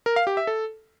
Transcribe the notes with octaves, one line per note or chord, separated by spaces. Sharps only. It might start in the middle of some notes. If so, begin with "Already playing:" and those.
A#4
F5
G4
E5
A4